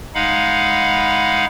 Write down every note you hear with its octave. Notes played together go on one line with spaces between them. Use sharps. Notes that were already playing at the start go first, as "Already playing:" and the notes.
G#3 D#4 F5 F#5 B5